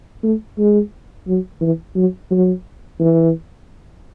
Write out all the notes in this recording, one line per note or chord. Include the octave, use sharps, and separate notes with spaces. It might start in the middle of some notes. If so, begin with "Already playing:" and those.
A3
G#3
F#3
E3
F#3
F#3
E3